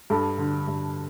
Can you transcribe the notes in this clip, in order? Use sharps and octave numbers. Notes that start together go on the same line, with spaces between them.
G2 A4
D3
G2